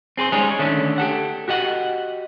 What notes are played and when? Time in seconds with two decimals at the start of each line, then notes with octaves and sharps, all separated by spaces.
0.17 C4 G#4 B4 C5
0.32 G3 G#3 C#4 D#4 G#4
0.59 D3 D#3 A3 C#4 D4
0.98 G4 A4 F#5
1.48 F#4 G4 D#5 F#5